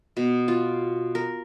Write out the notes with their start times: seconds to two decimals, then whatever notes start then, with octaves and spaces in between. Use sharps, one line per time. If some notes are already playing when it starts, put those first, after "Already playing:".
0.17 B2
0.48 F4
1.15 A#4